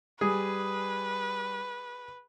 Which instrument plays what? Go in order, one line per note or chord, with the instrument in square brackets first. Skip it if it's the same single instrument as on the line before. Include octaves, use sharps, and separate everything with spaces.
[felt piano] G3 [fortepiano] G#4 [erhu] B4